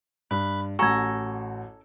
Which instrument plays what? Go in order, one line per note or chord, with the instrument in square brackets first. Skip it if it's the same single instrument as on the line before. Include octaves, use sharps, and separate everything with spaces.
[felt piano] G2 [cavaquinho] B4
[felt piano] A1 F#4 [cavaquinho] A4 G#5 A#5 [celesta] C#6 G#6